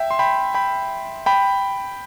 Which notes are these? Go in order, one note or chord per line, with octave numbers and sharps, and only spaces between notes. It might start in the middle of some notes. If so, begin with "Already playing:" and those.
Already playing: E5 G5
C6
G5 B5
G5 B5
G5 B5